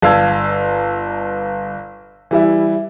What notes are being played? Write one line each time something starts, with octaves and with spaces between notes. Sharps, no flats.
G1 F5 A5 E6 G#6
E3 G3 E4